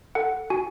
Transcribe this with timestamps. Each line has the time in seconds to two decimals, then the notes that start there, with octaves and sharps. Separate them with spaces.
0.15 A4 F#5
0.50 F#4 G#5